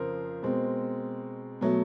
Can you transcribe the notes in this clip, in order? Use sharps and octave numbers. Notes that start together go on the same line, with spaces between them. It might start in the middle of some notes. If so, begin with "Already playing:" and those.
Already playing: F2 C#3 F3 A#4 C5
B2 G#3 C4
B2 F#3 A3